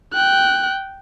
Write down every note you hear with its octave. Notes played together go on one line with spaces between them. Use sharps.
G5 F#6